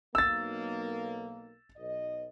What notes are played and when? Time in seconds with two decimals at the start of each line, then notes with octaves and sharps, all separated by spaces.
0.15 B1 A#3 E6 A6
1.77 B1 D#5